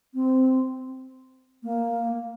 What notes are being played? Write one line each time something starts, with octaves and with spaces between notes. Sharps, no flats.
C4
A#3